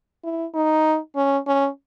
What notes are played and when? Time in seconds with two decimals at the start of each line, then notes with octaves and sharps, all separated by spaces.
0.24 E4
0.55 D#4
1.16 C#4
1.47 C#4